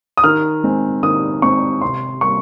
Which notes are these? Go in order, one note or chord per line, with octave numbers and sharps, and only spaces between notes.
D#6
D#3 F6
G#3 C4
D#3 D#6
G#3 C4 C#6
C3 C6
G3 A#3 C#6